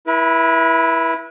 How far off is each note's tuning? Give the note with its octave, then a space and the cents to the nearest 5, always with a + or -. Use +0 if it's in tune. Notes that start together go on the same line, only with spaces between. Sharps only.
E4 +0 B4 -40